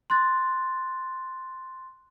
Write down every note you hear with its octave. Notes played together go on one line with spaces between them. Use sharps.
C6 F#6 A6